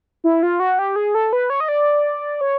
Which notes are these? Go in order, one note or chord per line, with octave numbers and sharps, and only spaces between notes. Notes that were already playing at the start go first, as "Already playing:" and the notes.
E4
F4
F#4
G4
G#4
A4
B4
C#5
D#5
D5
C#5